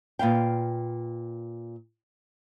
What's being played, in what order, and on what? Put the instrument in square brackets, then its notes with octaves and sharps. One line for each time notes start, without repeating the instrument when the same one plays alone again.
[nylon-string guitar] A#2 B4 F5 G5